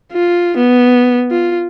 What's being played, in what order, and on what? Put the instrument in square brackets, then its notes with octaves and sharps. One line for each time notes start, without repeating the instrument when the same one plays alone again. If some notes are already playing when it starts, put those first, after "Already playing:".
[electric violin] F4
B3
F4